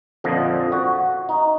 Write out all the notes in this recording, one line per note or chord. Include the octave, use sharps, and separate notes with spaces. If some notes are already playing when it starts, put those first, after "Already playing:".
F2 A#2 D3 F3 D#5
F#4
D#4